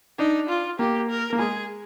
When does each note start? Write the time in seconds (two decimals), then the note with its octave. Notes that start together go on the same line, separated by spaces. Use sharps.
0.18 D4 D#4
0.49 F4
0.79 A#3 G4
1.10 A#4
1.33 A#3
1.39 G#3 G#4